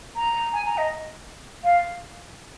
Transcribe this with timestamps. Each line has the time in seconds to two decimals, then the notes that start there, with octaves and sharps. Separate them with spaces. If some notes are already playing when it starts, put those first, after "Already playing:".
0.16 A#5
0.53 G#5
0.65 A#5
0.77 D#5
1.64 F5